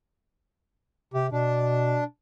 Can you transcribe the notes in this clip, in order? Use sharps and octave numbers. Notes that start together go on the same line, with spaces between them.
C3 G4
B2 D4